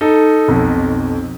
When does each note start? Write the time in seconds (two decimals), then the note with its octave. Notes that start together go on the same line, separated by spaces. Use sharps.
0.01 D#4 A4
0.48 B1 F2